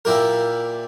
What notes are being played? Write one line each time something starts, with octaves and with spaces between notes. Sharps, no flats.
A#2 E4 G4 A#4